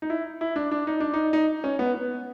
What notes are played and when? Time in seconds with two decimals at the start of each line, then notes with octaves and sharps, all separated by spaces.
0.02 D#4
0.10 E4
0.41 E4
0.56 D4
0.71 D4
0.87 D#4
1.00 D4
1.14 D#4
1.33 D#4
1.64 C#4
1.79 B3
1.95 B3